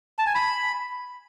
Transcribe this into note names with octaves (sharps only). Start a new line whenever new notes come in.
A5
G#5
B5